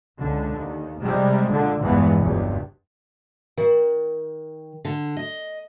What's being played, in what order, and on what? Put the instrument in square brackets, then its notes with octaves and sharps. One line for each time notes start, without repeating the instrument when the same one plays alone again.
[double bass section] C#2 D3
D#2
C3 G3 G#3
A#2 D3
A#1 E2 G2 E3 G#3 B3
F#1 C#2 G2
[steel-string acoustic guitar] D#3
D3
D#5